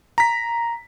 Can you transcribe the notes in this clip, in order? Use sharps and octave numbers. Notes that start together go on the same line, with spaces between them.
A#5 B6